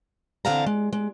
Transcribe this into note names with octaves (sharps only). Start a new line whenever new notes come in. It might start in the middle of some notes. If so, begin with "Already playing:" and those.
D3 E3 C4 F5 A5 A#5
G#3
G#3